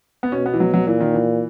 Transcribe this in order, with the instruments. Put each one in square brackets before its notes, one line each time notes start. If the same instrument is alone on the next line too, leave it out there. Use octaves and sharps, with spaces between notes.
[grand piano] B3
[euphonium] B2 [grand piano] C#4
[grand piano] B3
E3
F#3
F#3
[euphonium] A#2 [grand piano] E3
[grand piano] D#3
E3